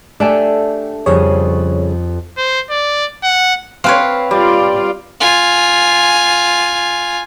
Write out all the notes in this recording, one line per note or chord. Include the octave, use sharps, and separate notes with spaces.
A3 D4 G4 A4 E5 G5 G#5
F2 C#3 G3 G#4 C#5 D#6
C5
D5
F#5
C4 B4 C#5 F5
G3 F4 D5
F4 G#5